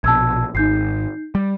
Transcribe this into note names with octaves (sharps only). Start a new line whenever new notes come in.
A#1 B2 A5 E6 G#6
G#1 D#4 G6 C7
G3